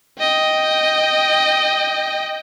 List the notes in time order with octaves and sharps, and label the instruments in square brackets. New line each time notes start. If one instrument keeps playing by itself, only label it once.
[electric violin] D#5 G5